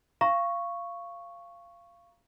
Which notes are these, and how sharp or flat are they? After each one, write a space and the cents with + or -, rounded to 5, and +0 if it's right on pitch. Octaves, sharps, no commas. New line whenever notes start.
F5 -15 A#5 +20 C#6 +0